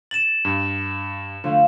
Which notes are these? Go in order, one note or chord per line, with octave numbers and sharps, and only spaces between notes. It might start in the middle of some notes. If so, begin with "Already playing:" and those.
A6 E7 F#7
G2
D3 F3 A3